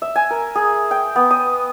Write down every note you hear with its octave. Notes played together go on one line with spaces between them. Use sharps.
E5
G#5
A#4
G#4
G5
B3
D#6